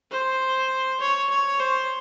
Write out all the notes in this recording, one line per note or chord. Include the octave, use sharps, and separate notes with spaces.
C5
C#5
C#5
C5